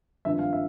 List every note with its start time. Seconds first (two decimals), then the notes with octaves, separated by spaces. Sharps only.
0.25 G#1 G2 F3 E5
0.39 F5
0.53 E5